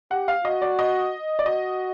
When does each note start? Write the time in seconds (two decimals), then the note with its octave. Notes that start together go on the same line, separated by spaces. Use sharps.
0.11 G4 F#5
0.28 F5
0.45 F#4 D#5
0.62 D5
0.79 D#5
1.39 D5
1.46 F#4 D#5